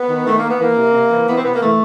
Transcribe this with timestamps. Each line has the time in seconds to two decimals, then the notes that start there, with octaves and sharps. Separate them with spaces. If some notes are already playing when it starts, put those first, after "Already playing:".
Already playing: B3
0.09 D#3
0.26 D#3 A3
0.37 A#3
0.43 D#3
0.49 B3
0.60 E3 A#3
0.76 C3
0.94 C3
1.10 E3
1.28 E3 B3
1.36 C4
1.45 C3 B3
1.53 A#3
1.61 E3 A3